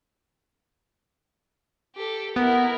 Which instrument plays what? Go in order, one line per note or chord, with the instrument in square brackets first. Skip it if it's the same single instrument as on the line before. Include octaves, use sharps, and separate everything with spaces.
[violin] G4 A4
[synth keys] B3 [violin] E4 A#4